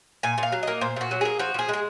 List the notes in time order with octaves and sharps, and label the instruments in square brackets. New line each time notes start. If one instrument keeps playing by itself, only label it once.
[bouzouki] A#2 G#5
A#2
F5
F#3
A#3 D#5
A#2 C5
A#2 F#4
F#3
A#3 G#4
F3 F#4
F3 G#4
G#3 G#4